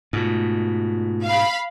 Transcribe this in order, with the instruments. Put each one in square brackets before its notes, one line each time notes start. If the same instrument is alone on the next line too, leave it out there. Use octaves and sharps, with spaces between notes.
[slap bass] G#2 B2 [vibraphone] A3 F4
[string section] F5 B5